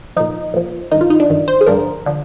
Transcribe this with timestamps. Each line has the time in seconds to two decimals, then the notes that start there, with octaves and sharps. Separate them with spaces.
0.17 A#2 F3 D#4
0.54 A#2 F3
0.92 G2 D#3 D#4
1.01 F4
1.10 D#4
1.20 D4
1.29 G2 D#3
1.48 C5
1.61 G#4
1.66 G2 D3 F3 A#4
2.06 D3 F3